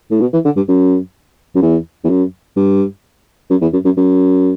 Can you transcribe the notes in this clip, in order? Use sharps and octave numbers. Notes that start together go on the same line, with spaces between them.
A2
B2
E3
D3
G2
F#2
F#2
E2
E2
F#2
G2
F#2
E2
F#2
F#2
F#2